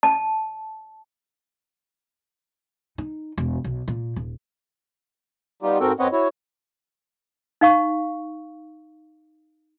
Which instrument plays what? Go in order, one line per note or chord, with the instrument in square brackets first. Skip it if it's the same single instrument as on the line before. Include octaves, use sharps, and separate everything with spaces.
[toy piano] A5
[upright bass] D#4
E1
B1
A#2
D#1
[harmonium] G3 B3 D#4 F4 G4
G#2 C4 F#4 A4 A#4 G5
F#2 C4 B4 C#5 D#5 F#5
E4 F#4 C#5
[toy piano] D#4 F5 C#6